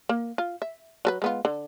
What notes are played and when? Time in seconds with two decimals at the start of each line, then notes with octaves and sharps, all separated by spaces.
0.09 A#3
0.38 F4
0.62 E5
1.05 F#3 A4 B4
1.22 G#3 B3 F4
1.45 D3